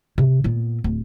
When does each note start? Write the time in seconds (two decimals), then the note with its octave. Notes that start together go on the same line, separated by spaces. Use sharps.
0.18 C3
0.44 A#2 B3
0.84 D1